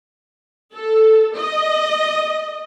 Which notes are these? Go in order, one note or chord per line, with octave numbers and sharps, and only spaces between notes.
A4
D#5